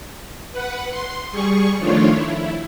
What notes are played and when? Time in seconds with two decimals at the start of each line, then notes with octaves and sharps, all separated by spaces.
0.52 B4 F#5
0.90 C6
1.31 G3 G#4 C#6
1.78 D#3 F3 A3 D4 F4 C#5
2.12 E4